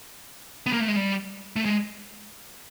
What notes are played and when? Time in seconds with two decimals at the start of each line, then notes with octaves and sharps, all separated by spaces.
0.66 B3
0.73 A#3
0.80 A3
0.88 G#3
0.96 G3
1.56 A3
1.65 G#3